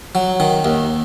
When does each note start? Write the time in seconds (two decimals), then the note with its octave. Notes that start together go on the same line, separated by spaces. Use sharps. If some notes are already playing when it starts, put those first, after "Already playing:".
0.15 F#3
0.40 D#3
0.65 D#2